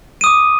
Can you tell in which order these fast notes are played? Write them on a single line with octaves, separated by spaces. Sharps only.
D#7 D#6 D6